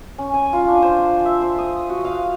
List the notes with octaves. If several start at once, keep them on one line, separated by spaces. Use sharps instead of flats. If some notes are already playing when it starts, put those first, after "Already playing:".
C#4
G#5
F4
D4
C5
E5
C5
D#6
F#4
F5